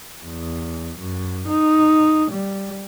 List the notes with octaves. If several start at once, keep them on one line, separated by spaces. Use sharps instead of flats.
E2
F#2
D#4
G3